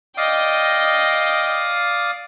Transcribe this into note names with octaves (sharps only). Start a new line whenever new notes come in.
D5 D#5 F5 G5 D#6